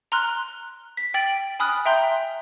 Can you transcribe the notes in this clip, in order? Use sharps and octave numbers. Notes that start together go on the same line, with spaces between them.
A#5 C6 F6 F#6
B6
G5 A6 D7 F#7
G#5 B5 D#6 F6 F#6
E5 G5 A#5 C6 G6